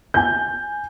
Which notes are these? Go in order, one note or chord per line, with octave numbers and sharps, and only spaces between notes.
G#5 G6